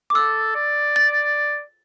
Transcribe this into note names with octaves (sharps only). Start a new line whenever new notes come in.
D6
A4 E6
D5
A6